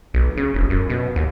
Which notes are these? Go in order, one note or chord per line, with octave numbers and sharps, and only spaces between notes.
B1
C#3
F1
F#2
B2
D#2